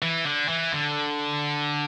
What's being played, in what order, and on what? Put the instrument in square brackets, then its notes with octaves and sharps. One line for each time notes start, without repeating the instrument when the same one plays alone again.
[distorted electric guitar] E3
D3
E3
D3